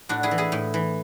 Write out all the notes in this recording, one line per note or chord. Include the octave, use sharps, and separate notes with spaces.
A2 D4 F#4
E4 G#4
E3
E4 G#4
A2
E3